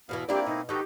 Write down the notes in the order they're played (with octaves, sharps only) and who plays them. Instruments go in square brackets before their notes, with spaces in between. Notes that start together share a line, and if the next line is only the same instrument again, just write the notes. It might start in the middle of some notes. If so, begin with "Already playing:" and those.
[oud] E2 B2 E3 [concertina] B3 F5
[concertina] A#3 C4 E4 [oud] D4 F4 D5 [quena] G4
[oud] B2 [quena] D#4
[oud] D#3 D#4 [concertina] F#4 A4 B4 [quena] G4